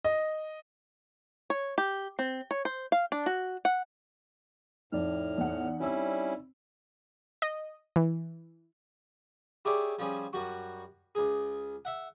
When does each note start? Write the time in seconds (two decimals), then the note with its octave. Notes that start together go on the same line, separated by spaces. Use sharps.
0.05 D#5
1.50 C#5
1.78 G4
2.19 C4
2.51 C#5
2.65 C5
2.92 F5
3.12 D4
3.26 F#4
3.65 F#5
4.93 F2 A2 D#4 D5 F6
5.38 E2 F#5
5.80 G3 C4 C#4 E4 E6
7.42 D#5
7.96 E3
9.65 E4 G4 G#4 C#5 D5
9.99 F3 G3 C#4 G#4
10.33 F#2 G3 F#4 C#6
11.15 C#2 G#4
11.85 E5 F#5